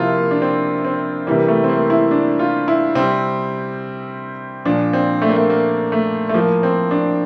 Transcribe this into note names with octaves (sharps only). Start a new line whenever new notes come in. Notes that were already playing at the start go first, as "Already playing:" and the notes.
Already playing: C3 F3 A#3 E4 F4
A#3
D4
C4
C4
C3 E3 G3 A#3
A3
C4
A#3
E4
D4
F4
E4
C3 G3 C4
A#2 F3 D4
C4
A3
A#3
A3
A#3
A3
A3
A2 F3 A#3
C4
D4